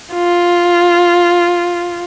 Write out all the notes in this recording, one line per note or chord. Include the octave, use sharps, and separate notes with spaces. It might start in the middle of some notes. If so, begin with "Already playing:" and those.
F4